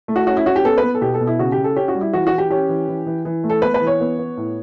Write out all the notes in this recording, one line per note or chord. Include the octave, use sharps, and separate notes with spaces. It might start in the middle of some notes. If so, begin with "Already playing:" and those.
A3
F#4
C#4 F#4
E4
C#4 F#4
G4
B3 A4
B4
B3
A4
B2 G4
A4
B2
E4
C#3 F#4
G4
C#3
A4
C#4 G4
F#4
G3
E4
E3 F#4
F#4
E3
G4
C#4 G4
E3
E3
E3
E3
A3
A4
B3 B4
B4
E3
C#5
B3
B3
A2